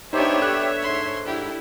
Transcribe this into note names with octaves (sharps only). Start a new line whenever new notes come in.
B3 D4 D#4 G4 C5 C#5 E5
A4 F#6
G#2 C6
D4 E4 G4